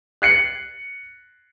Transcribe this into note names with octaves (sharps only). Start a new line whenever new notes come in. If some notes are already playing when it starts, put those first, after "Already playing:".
F#6 C7 C#7 F#7